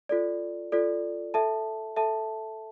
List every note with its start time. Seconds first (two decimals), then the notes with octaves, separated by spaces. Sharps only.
0.09 F4 A4 D5
0.72 F4 A4 D5
1.34 A4 E5 A5
1.96 A4 E5 A5